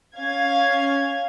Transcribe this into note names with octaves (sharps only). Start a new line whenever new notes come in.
C#4 F5 G#6